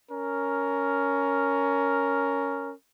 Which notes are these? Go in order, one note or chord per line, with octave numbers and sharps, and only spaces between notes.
C#4 A#4